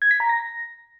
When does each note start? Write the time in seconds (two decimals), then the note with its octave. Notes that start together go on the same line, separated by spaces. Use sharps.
0.02 G#6
0.11 B6
0.20 A#5
0.29 A#6